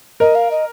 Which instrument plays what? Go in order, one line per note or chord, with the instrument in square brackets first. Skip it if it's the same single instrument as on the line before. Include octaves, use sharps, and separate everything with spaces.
[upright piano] A#4 [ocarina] D#5
[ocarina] F5
D#5